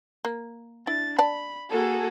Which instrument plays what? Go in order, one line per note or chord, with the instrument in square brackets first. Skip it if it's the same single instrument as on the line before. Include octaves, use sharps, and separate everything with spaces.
[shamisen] A#3
[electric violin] D4 A6 [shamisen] E4
[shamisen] D5 A5 [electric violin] B5
[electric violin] A#3 F#4 [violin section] G#4 A4